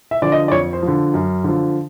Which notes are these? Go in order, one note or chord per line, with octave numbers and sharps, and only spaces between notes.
E5
D3 F3 D5
D#5
D5
F2 C#5
C5
F3
D3
F#2
D3 F3